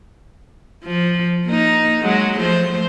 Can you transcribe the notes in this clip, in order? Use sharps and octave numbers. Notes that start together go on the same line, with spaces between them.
F3
A#3 D#4
F#3 G#3 F#4
F3 A3 C5